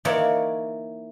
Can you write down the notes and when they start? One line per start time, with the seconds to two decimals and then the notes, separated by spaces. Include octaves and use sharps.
0.05 E3 A#3 D#4 C#5 D5